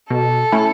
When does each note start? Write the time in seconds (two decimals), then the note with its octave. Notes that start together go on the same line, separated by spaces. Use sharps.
0.10 B2 A4
0.52 A3 C#4 E4